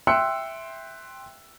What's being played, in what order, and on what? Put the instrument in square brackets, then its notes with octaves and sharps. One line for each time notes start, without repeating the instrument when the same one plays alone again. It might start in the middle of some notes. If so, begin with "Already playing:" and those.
[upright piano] E5 G5 C6 E6 F#6 C#7